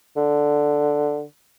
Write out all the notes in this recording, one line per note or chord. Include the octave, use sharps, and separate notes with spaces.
D3